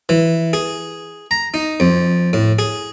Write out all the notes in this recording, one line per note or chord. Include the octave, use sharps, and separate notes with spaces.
E3
G#4
A#5
D#4
F2
A2
G#4